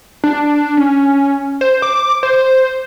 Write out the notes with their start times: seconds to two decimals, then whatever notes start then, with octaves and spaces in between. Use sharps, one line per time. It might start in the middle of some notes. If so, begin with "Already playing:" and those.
0.24 D4
0.77 C#4
1.61 C5
1.82 D6
2.23 C5